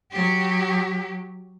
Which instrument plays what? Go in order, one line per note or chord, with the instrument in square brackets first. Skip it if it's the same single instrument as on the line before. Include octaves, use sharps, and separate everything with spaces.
[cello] F#3 G4